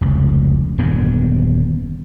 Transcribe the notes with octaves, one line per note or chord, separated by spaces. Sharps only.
F1 C#2
D#1 F#2 D3 B3